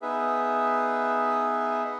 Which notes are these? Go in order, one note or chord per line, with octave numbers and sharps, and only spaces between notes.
B3 D#4 G#4 B4 E5
D#5 F#5